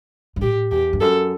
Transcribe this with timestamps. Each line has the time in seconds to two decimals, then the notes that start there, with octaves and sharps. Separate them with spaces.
0.36 G2
0.41 A2 G4
0.71 E2 G4
0.93 G2
1.01 F#2 A4